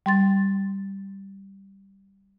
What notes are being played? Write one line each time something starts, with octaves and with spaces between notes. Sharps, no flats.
G3 C6 A6